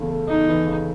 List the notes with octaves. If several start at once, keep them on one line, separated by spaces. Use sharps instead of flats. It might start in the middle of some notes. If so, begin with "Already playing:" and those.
Already playing: E2 C#3 A3
A3
E2 D#4
E3
C#3